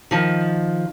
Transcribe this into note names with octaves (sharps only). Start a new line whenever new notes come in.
D#3 F3